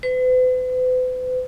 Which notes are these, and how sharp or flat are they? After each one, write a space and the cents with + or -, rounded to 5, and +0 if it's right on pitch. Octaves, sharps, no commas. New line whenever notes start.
B4 +45